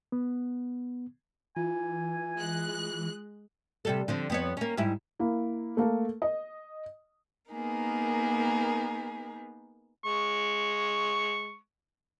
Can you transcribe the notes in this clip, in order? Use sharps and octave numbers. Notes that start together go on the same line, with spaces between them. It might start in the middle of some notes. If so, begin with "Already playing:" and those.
B3
E3 F4 G#5
G#3 F#6
C3 G3 A4
D3 F3 C4
F2 B3 C#5
A#3 C#4
G#2 G3 E4
A#3 E4
A3 A#3 A4
D#5
A#3 B3 D#4 G#4 A#4
G#3 C#6